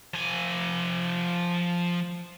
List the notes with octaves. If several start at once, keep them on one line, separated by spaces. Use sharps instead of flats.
F3 G#5